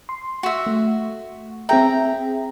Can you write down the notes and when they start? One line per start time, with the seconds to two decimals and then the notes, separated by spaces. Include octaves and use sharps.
0.09 C6
0.43 F#4 E5
0.66 A3
1.69 C4 G#4 E5 G5 A#5